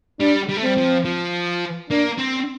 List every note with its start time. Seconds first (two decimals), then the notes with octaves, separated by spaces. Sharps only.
0.20 G3 D4
0.49 G3
0.57 A3
0.63 G3 C4
0.77 F3
1.05 F3
1.90 A#3 D4
2.18 C4